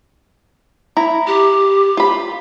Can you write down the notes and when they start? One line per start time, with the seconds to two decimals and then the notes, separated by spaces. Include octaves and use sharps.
0.97 E4 A#5
1.27 G4
1.97 F4 B5